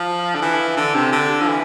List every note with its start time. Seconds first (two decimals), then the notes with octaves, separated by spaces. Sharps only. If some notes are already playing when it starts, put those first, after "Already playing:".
Already playing: F3
0.35 D3
0.41 E3
0.77 D3
0.95 C3
1.12 D3
1.42 F3
1.48 E3